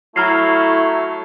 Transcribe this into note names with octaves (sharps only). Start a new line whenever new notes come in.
F#3 A3 E4 A#5 F6 C7